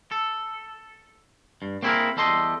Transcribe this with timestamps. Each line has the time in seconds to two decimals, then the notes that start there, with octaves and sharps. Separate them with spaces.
0.11 A4
1.62 G2
1.83 A#3 C4 E4 F#4 G#4 A#4
2.17 E2 G3 A4 D#5 C6